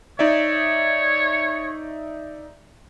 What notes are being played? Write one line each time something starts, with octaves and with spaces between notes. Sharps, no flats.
D#4 C#5 D5 E5